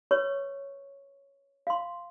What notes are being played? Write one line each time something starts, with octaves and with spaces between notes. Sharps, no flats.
B4 C#5 C#6
F5 C6